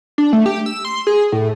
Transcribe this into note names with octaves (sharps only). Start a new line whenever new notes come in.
D4
A3
G4
E6
C6
G#4
A2